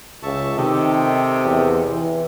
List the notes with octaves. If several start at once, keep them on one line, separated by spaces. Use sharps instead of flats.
C#2 E5 A5 C#6
C3 D#3 G4 A4 D#5
E2
E3